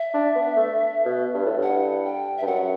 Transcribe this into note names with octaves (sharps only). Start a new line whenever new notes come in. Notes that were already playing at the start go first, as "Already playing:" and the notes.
Already playing: E5
D4
B3
A3
B2
G2
A2
G2 F#5
G5
G2 E5
F#2 F#5